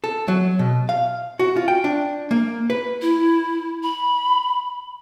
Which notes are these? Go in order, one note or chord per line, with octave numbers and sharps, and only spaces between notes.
A4
F#3
B2
F5
F#4
F4
G5
D4
A#3
B4
E4
B5